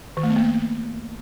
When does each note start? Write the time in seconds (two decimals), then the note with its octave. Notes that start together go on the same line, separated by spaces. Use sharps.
0.17 D#3
0.23 A3
0.30 B3
0.36 A#3